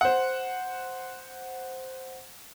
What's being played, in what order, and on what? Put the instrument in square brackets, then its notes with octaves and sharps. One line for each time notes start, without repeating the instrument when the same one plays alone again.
[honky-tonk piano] C5 F#5